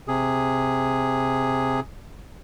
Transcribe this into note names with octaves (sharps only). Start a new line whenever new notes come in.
C3 G#4